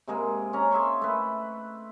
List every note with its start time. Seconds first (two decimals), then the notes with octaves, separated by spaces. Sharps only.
0.07 C3 G#3 A#3 G#4
0.53 C#4 A#5
0.71 G#4 E5 C6 C#6
1.01 A3 B4